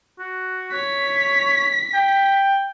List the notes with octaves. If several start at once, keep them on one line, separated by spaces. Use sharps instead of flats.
F#4
C#5 B6
G5